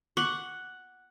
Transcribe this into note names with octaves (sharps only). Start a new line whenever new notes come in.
F#5 C#6 D6